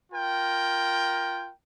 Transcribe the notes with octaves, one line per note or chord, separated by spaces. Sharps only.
F4 A#4 G5